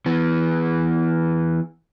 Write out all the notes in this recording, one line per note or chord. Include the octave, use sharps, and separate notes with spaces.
E3 B3